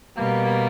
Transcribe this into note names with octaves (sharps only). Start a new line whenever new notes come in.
B2 G3 A#3